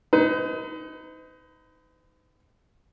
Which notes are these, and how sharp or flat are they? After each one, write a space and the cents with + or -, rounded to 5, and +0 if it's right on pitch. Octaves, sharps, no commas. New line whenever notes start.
D#4 +20 B4 +45